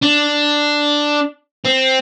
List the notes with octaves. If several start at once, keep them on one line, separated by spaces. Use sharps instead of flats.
D4
C4